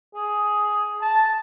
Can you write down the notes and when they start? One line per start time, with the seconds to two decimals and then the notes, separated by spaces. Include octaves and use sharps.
0.15 G#4
1.01 A5